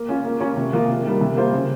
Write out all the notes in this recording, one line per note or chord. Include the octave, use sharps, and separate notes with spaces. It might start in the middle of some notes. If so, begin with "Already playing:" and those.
Already playing: A#3
C#4 F4
A#3
C#4 F4 A#4 C#5
C3
F3 A#3 F4
C3
D#3 G3 A#3
C3
G3 A#3 F4 C5
C#3